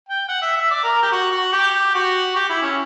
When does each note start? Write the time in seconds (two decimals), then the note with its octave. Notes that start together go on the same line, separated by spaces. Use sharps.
0.09 G5
0.29 F#5
0.43 E5
0.57 E5
0.71 D5
0.84 A#4
1.03 G4
1.12 F#4
1.32 F#4
1.53 G4
1.95 F#4
2.35 G4
2.49 E4
2.62 C#4